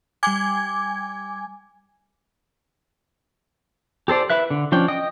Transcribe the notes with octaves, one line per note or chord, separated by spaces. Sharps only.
G3 G5 G#5 D6 G#6
G4 A4 C5 D5
E4 B4 E5 F#6
D3
F3 C#4 D4 G5
D#5 G5 D#6